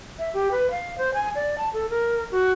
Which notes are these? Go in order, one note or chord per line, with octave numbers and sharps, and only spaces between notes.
E5
G4
B4
F5
C5
G#5
D5
A5
A4
A#4
F#4